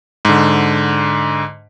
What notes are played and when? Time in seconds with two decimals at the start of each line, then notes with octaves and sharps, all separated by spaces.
0.25 G#2 D3